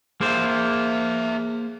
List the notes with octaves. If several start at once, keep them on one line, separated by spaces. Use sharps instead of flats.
A#3 G#4 C5 E5